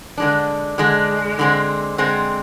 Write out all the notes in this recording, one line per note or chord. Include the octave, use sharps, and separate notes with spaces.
D3 G#3 D4
D3 G#3 D4
D3 G#3 C4
D3 G#3 C4